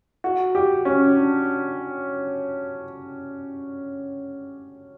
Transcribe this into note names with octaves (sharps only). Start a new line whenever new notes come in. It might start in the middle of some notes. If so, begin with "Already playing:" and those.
F#4
G4
C#4
D4